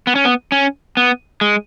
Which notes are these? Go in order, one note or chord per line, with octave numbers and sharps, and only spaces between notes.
B3
C#4
B3
C#4
B3
G#3